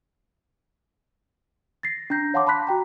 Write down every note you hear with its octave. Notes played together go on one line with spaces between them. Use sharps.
A6 A#6 C7
D4 A#5 G6 A#6
C#5 F5 F#5 A5 C6 D6
A5 B5 C6 F#6 B6
F#4 G5 A#5